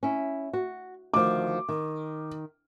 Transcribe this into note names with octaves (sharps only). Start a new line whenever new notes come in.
C#4 E4
F#4
D2 D#3 F3 D6
D#3